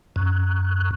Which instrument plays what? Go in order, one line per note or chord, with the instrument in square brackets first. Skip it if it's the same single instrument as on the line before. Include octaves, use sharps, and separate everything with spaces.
[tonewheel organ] F#2